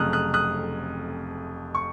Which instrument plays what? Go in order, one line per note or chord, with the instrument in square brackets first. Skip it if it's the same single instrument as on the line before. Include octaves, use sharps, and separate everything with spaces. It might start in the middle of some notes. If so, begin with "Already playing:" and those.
Already playing: [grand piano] F1 F2 C#3 F#3 A3 D#6 F6 F#6
D#6 F#6
D#6 F#6
C#6